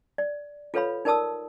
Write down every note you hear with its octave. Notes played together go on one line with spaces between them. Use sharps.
D5
F4 A4 B4 C#5 F5 B5
D#4 A#4 D5 A5 D#6 E6